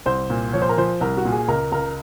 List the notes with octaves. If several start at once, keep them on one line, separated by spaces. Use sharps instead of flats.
C2 C5
A#2
F3 C#5
C5
A#4
F3 C5
C2 A#4
F#4
A#2
G#4
C#2 A#4
C#2 A#4